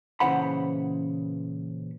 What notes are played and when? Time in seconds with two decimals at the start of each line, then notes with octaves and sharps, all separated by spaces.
0.20 A#2 C#3 E3 C5 F#5 B5